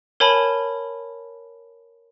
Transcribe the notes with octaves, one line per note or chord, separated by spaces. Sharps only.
A#4 C#5 G#5 A5 B5